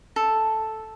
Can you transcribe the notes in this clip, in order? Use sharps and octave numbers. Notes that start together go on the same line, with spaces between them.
A4